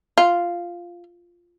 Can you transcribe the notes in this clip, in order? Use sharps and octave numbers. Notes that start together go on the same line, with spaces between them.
F4